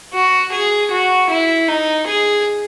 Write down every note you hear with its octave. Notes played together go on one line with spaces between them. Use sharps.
F#4
G#4
F#4
E4
D#4
G#4